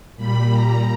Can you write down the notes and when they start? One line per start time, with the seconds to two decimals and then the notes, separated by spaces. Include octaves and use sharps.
0.16 A#2 G3 B5
0.50 A#5